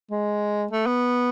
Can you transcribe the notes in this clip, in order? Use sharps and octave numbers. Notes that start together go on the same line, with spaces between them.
G#3
A3
B3